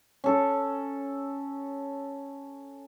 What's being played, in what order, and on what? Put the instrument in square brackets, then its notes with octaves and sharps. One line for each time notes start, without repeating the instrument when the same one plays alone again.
[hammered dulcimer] C#4 A4